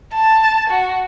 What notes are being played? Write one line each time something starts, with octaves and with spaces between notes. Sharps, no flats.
A5
F#4